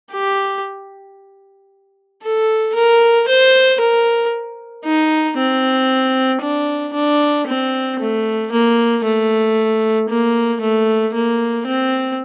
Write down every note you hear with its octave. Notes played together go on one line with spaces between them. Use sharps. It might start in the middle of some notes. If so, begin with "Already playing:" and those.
G4
A4
A#4
C5
A#4
D#4
C4
D4
D4
C4
A3
A#3
A3
A#3
A3
A#3
C4